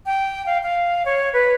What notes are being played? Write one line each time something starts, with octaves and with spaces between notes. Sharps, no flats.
G5
F5
F5
C#5
B4